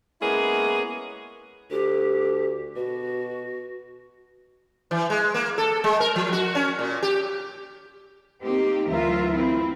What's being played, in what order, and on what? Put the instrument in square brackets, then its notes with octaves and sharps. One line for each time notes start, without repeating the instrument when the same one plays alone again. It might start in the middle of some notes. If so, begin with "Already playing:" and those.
[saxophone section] G#3 A#3 B3 C#4 E4 G#4
[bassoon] D2 [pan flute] G4
[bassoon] B2 [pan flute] F#4
[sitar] E3
G#3
A#3
A4
G#3
A#4
F3
F#4
C#4
A#2
G4
[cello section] A#3 C4 D#4 G4
D2 E3 F#3 F4 A#4 E5
C4 E4